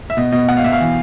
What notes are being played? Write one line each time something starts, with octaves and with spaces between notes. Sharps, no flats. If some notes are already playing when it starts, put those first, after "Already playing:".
E5
B2 D#5
B2 D#5
B2 F#5
F5
B2 E5
F5
E3